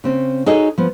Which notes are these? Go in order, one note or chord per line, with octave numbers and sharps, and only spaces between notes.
C#3 C4 C#4
D#4 F#4 G#4 A4 C#5 D#5
F3 B3